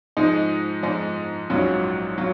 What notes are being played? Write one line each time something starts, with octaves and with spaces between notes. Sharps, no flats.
G#2 F3 G#3 D#4
G#2 F3 G#3 D#4
A#1 G#2 F#3 C#4 F4
F#3 F4